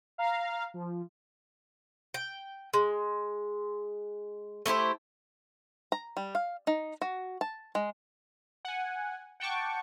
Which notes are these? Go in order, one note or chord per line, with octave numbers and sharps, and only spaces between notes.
F5 A#5
F3
G5
G#3
A3 E4 G4 C5
A#5
G3
F5
D#4
F#4
A5
G#3
F#5 G#5
F#5 G5 A5 C#6 D6